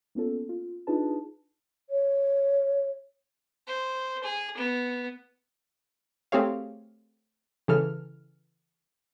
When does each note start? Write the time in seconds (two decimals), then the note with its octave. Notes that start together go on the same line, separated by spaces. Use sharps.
0.15 A#3 B3 C#4 F4 A4
0.49 F4
0.87 D4 D#4 F4 G#4 B4 A5
1.90 C#5
3.68 C5
4.23 G#4
4.57 B3
6.32 A3 C4 G4 G#4 C#5 F5
7.68 C#3 E3 A4 F6